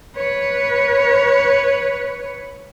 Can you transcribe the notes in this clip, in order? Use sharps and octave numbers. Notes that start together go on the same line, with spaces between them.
B4 C#5